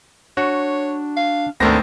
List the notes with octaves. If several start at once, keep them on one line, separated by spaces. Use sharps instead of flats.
D4 F#4 C#5
F5
G#1 D2 A3 B3 C4 D4 A#4 A#6